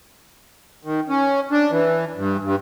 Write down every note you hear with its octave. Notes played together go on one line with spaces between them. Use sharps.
D#3
C#4
D4
E3
G2
G2